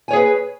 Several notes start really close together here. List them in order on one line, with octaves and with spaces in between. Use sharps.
G#5 C#5 G#4 B4